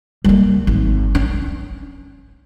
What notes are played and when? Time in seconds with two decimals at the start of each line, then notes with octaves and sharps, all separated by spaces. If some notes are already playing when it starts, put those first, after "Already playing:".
0.24 G3 A#3
0.67 G#1
1.15 C#4